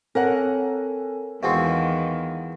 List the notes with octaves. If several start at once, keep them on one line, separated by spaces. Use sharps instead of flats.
C4 A4 A#4 C#5 F#5 G#5
E2 B2 D#3 G#3 C4 F5 C#6